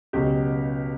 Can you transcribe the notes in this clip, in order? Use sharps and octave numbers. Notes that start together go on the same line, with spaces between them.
C#2 B2 F#3 G4